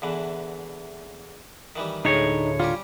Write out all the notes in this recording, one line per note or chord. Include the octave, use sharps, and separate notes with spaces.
E2 D3 E3
D#3 E3 G3
D2 A2 G#3 D#4 C#5
G3 C#4 F4 G4